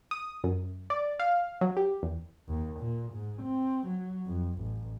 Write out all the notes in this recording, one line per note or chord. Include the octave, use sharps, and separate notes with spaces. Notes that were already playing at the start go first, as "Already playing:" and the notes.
D#6
F#2
D5
F5
F#3
G4
E2
D#2
A#2
G#2
C4
F#3
F2
A1